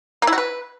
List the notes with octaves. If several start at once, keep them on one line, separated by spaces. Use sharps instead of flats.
A#3
E4
F#4
B4